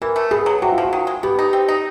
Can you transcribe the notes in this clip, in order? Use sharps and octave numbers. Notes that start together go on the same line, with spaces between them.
E3 A#4
A3
B2 G#4
F#3
C3 F#4
F4
F3 F#4
D#3
G#3
B3 G4
D#4
C4
D#4